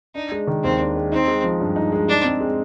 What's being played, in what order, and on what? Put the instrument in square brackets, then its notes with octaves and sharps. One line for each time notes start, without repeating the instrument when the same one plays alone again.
[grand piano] D4 [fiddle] D#4
[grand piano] G#3
D#3
[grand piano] D#2 [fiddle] C4
[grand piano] D4
G#3
[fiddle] C4 [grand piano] D#4
[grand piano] G#3
F3
G2
D#4
G#3
[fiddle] D4 [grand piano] D#4
[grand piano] C4
G#3